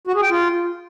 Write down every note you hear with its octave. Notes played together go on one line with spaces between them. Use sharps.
F#4
G#4
G5
F4